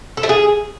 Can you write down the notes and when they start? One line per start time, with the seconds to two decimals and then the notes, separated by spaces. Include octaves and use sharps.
0.17 A4
0.23 A3
0.29 G#4